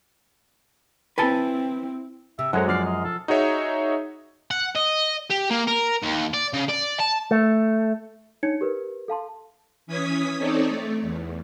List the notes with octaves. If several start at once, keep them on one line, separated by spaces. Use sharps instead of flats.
C4 E4 B4 G#5 A5
C3 E5
F#2 F#3 G#3 F#4 A4 C5 C#5 F#5
F3 D5 F6 C7
D#5
A4
D#4 F#4 G#4 C#5 E5
F#5
D#5
G4
A#3
A#4
D#2
D5
C#3
D5
A5
A3
D4 D#4 C#5 G#6 C#7
G4 A#4 B4
A4 F5 A5 C6
E3 C#4 D#6 G#6 B6
C4 D#4 A4 C#5 D5
A3
E2